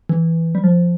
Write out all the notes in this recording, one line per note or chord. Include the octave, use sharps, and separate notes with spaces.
E3
G3
F3